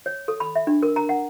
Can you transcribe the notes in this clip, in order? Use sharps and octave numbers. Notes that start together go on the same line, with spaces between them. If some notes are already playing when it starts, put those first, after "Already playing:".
C#5
A4
B5
E5
D4
A#4
A#5
F#5